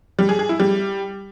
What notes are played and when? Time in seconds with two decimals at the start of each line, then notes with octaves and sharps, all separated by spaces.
0.19 G3
0.29 G#4
0.39 G#4
0.49 E4
0.60 G3